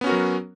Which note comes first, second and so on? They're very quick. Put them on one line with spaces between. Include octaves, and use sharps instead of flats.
B3 C#4 F#4 A#4 F#3